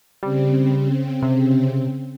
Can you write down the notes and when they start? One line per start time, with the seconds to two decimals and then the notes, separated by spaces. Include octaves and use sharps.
0.23 C#3 G3 C4
1.22 C3